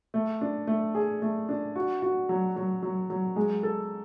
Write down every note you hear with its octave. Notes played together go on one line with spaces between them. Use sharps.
A3
D4
A3
G#4
A3
D4
F#4
F#4
F#3
F#3
F#3
F#3
G#3
A4